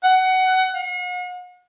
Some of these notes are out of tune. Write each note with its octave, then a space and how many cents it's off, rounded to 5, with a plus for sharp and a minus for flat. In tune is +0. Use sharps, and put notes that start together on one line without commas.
F#5 +20
F#5 -45